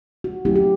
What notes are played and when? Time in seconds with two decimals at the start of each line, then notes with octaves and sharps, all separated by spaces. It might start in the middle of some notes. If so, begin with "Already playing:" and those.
0.24 F#4
0.45 F#3 A3 C#4 E4 G4
0.56 G4